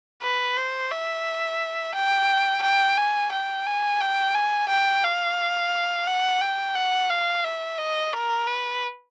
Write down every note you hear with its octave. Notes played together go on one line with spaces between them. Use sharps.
B4
C5
E5
G5
G5
G#5
G5
G#5
G5
G#5
G5
F5
F#5
G5
F#5
F5
E5
D#5
A#4
B4